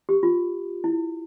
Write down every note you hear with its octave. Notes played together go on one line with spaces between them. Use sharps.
G4
F4
E4